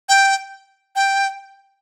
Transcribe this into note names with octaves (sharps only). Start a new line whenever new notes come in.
G5
G5